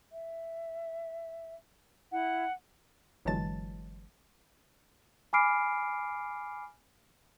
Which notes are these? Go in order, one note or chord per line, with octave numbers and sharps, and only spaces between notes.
E5
E4 F#5
G1 E3 F#3 G#3 A5 A6
G#5 B5 D6 F6 C7 D7